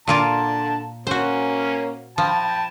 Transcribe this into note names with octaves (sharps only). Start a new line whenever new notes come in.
A#2 D3 A#3 F4 A5
A#3 C#4 F#4 C5
F3 G5 A5 B5